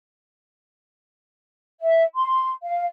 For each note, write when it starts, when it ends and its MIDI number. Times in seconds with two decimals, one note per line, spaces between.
1.81 2.03 76
2.15 2.51 84
2.64 2.86 77